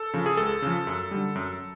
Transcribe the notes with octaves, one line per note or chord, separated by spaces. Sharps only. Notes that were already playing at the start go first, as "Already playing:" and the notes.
Already playing: A4
C#3 F3
G#4
C#2 A4
C#3 F3
F#2
D3 G3
F#2